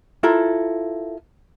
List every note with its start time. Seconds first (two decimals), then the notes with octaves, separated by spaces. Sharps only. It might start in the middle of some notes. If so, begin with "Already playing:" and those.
0.23 E4 F4 A4 A#4